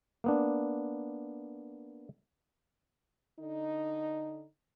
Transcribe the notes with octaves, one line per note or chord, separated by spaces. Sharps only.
A#3 B3 D4
D3 D#4